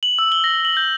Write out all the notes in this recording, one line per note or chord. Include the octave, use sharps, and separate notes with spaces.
F#7
E6
G7
A#6
F#7
G6